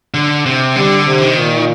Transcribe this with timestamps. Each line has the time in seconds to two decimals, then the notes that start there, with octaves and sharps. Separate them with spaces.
0.14 D3
0.46 C3
0.76 D3 G3
1.06 C3
1.21 D#3
1.37 A#2